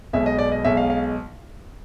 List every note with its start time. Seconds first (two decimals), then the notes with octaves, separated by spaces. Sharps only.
0.13 B1 B2 G#3 E5
0.26 D#5
0.39 D5
0.52 D#5
0.64 B1 B2 G#3 E5
0.77 F5
0.90 F5